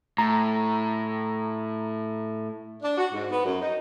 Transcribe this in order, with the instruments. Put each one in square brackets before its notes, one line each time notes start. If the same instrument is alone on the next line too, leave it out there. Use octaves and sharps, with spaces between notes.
[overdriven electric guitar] A2 [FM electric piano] A#5
[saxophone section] D4
F#4
G#2
B3
F#2
D#4